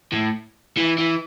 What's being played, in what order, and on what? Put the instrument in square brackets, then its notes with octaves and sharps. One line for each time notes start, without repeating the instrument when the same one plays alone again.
[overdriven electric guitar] A2
E3
E3